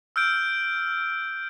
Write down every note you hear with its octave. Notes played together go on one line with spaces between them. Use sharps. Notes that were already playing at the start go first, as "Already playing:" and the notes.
E6 F6 G6 D7